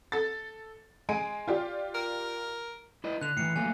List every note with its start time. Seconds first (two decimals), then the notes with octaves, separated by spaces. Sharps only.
0.12 A4 A6
1.09 G#3 G#5 D7
1.48 F4 G4 D5
1.94 A#4
3.04 E4 B4 D#5
3.21 D3 F#6 F7
3.37 A2 E3 C7 C#7
3.56 F#3 A3 A#3 G#5